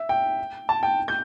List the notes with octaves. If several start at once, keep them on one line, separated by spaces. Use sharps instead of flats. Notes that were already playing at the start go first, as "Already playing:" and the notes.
Already playing: E5
G5
A5
G5
G6